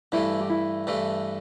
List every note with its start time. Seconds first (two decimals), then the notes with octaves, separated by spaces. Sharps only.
0.12 G2 E3 A3 E4
0.40 G4
0.50 E4
0.87 G2 E3 A3